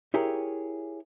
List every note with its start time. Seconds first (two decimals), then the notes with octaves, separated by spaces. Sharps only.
0.14 E4 G4 G#4 A#4 C#5